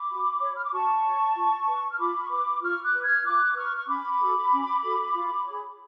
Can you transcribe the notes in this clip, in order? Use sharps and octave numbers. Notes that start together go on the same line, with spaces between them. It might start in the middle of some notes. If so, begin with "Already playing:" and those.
Already playing: B5 D6
F#4
C#5
F6
D6
F#4 A5 C#6
C#5
F4
B4
F6
F4 B5 D6
C#6
B4 B5 D6
F4 C#6 F6
D6 F#6
B4
F6 G#6
F4 D6 F#6
B4 C#6 F6
C#6
C#4 B5 D6
F#4 A4
C#4
F#4 A4
F4
G#4 C#5